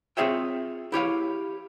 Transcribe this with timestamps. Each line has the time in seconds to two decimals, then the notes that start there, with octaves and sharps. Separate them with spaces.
0.17 C4 F4 G#4 C#5 E5 G5
0.92 E4 G4 C#5 F5